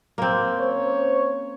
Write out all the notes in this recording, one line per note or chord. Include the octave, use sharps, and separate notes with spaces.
A#3 C4
C#4 C5 C#5